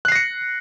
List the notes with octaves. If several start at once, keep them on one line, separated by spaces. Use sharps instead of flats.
F#6 A#6 C7 C#7